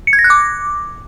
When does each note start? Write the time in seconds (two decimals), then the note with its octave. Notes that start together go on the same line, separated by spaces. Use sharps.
0.07 C#7
0.13 G#6
0.19 A#6
0.24 F#6
0.30 D6